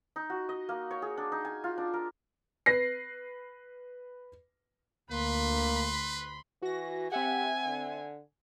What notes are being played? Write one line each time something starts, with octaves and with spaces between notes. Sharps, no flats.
D#4
F#4
D#5
A#3
C#5
G#4
D4
D#4
G#5
F4
D4
A#4
B4 A#6 C7
D2 A#3 B4 B5 C6
E3 F#4 A#6
C4 G4 E5 F#5 G#5
D3